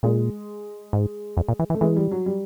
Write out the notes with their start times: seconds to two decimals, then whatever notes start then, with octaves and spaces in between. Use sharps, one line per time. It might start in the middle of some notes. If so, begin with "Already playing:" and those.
0.03 A#2 G#3
0.93 G#2
1.37 F2
1.48 A#2
1.59 E3
1.70 E3
1.74 A3
1.81 E3 G#3
1.96 G3
2.11 F#3
2.26 G3